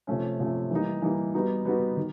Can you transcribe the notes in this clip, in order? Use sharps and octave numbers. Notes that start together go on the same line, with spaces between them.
C3 F3 A3 C#4
C3 F3 A3 C#4
E3 G3 A#3 D#4
E3 G3 A#3 D#4
G3 B3 D#4 F#4
G3 B3 D#4 F#4
D#3